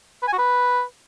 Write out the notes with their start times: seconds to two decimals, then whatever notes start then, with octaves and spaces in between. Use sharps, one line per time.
0.22 B4
0.28 G#5
0.33 F#4
0.38 B4